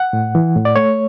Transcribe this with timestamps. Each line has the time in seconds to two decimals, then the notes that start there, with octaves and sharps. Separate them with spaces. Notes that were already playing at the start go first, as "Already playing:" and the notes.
Already playing: F#5
0.13 A2
0.35 E3
0.56 A2
0.65 D5
0.76 A3 C#5